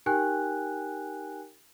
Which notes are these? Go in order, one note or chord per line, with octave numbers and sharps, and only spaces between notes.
D#4 G4 A#4 G5 G#5 F#6